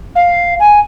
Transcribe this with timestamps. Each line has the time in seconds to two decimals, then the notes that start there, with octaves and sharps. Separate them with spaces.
0.15 F5
0.59 G#5